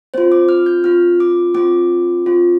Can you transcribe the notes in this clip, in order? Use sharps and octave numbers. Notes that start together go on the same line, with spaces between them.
C4 F4 C5
D6
F6
G6
C4 F4 F6
D6
C4 F4 D6
C4 F4